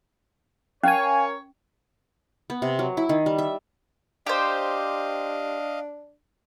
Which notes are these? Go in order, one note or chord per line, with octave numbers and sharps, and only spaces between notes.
C#4 A#4 C#5 F5 G#5
B3
C3
F#3
E4
D#3
G3
E5
D4 G4 C5 D#5 F5